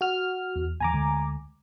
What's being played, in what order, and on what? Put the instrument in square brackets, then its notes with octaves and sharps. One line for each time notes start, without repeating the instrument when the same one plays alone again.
[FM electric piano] F#4 F6
[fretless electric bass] E2
[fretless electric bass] E2 D#3 E3 [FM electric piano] G#5 A#5 D6
[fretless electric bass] D2 D3 G#3